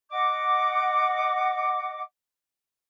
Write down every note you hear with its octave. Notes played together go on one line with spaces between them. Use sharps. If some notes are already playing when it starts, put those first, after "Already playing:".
D#5 F#5 D6